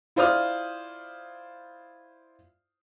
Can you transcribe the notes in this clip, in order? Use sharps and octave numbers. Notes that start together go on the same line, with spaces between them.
E4 F4 C5 D5 D#6 F6